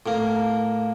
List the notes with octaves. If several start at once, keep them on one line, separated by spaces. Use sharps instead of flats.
A2 A#3